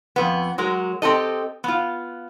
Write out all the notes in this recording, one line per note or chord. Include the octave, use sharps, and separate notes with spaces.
F2 B3
F#3 G#3 A#4
C4 G4 A4 D#5
B3 F4